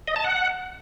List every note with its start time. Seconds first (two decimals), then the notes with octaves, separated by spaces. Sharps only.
0.08 D#5
0.16 A5
0.24 F#5